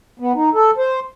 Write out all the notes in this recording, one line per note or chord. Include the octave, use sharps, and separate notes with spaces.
B3
D#4
A4
C5